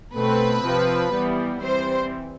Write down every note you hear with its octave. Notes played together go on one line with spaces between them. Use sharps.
B2 A3 C4 B4
C3 F3 C4
E3 G3 B3
E3 G3 C4 C5